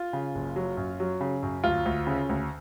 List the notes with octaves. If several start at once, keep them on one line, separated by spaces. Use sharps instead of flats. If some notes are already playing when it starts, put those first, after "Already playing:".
Already playing: F4
C#3
F#1
F#3
F#2
F#3
C#3
F#2
D2 F4
D2
C#3
D2